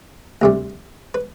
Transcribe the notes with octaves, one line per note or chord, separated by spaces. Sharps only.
D2 C3 G3
B4